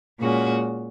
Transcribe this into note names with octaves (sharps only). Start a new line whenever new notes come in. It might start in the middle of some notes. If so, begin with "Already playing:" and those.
A#2 G#3 C#4 F#4